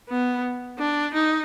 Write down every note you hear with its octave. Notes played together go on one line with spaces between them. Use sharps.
B3
D4
D#4